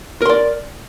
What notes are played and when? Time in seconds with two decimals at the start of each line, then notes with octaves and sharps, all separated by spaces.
0.22 A#4
0.25 C6
0.29 D5